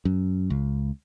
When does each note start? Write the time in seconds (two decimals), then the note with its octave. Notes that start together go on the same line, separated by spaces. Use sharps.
0.05 F#2
0.50 C#2